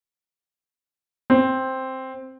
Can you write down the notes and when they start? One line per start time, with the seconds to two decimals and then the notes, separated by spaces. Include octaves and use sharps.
1.30 C4